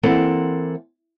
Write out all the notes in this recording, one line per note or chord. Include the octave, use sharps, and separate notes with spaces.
E3 A#3 C4 A4 F#5